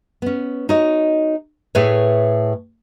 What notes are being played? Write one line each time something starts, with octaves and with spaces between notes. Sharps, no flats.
B3 C#4
D#4 F#4 C#5 D#5
A2 A3 G#4 B4 C#5